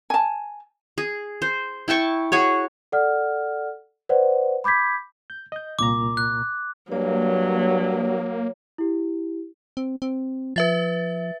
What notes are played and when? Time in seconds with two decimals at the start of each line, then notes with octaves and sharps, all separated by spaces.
0.10 G#5 A5
0.98 G#4
1.42 C5
1.88 E4 G5 A5 C#6
2.32 F#4 G#4 C#5
2.92 A4 D5 F#5 F6
4.09 B4 C5 D5 F#5
4.64 B5 D6 G6 G#6 B6
5.30 G6
5.52 D#5 G6
5.79 C2 A#2 A#5 D6
6.17 F#6
6.92 G2 F#3 A#3 C#5
8.78 E4 G4
9.77 C4
10.02 C4
10.56 F3 B4 E5 A6